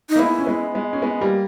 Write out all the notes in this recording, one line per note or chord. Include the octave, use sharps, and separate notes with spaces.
D#4
A#3
G#3 B3 E4
C#4
G#3 B3
G#3 B3
C#4
G#3 B3
G3 A#3